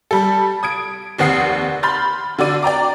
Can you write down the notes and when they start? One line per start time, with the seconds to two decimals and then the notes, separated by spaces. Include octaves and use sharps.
0.11 G3 A4
0.63 D#6 G#6 D7
1.18 F1 D#2 C4 F#5 D#6 C7
1.83 B5 C6 F6 G6 A6
2.39 D3 F#4 D5 D#7
2.63 D5 G5 A#5 D6